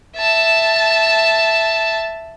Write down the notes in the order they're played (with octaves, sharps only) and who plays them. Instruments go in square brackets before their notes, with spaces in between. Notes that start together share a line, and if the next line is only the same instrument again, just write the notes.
[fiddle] E5 A5